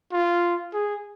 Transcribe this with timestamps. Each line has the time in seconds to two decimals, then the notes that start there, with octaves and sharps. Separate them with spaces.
0.12 F4
0.73 G#4